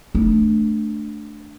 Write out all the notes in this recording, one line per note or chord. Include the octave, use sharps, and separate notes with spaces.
A3 D4